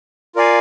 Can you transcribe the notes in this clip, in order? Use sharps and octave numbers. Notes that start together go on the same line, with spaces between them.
F4 A#4 D5 F5 G#5